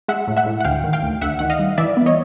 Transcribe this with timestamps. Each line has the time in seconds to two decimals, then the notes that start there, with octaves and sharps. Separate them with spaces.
0.08 G#3 E5 F#5
0.28 A2
0.37 E5 F#5
0.46 A2
0.61 F#5
0.65 D2 F5 G5
0.84 D#3
0.93 F5 G5
1.03 D2
1.21 D2 E5 F#5
1.39 D#3 F#5
1.50 D#5 F5
1.59 G3
1.78 E3 D5 E5
1.97 B3
2.06 C#5 D#5